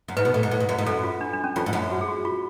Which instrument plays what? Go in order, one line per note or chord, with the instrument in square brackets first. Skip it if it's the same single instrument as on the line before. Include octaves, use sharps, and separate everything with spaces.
[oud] F#2
[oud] G#2 [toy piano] B4
[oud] B2
A2
G#2
A2
G#2
F#2
G#2
[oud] F#2 [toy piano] A4
[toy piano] F4
D4
D4
C#4
[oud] F2 [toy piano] F4
[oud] G#2
F#2
[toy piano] F#4
G#4
F#4
F4